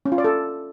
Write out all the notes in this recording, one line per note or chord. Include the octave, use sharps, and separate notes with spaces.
C#4
F4
D5
A4